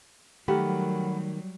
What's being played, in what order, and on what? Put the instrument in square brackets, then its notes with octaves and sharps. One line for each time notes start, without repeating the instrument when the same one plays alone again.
[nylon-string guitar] D#3 A3 [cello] F#3 G3 [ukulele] G4 [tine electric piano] A#4 F#5 B5